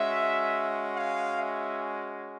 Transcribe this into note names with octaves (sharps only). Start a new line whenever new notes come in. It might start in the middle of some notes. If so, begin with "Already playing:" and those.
Already playing: G#3 C#4 F#4 E5
F5
E5